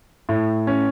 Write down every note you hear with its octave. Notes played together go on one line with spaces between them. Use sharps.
A2
C#4